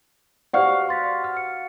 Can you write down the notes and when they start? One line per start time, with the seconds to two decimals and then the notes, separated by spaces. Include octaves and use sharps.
0.53 F#4 G4 C5 D5 F5
0.89 C6 A6 B6
1.24 F6
1.37 C#7